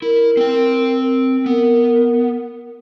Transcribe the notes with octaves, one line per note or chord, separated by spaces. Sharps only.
E4 A#4
C4 G5
B3 A#4